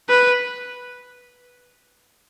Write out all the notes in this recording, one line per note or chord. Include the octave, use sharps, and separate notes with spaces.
B4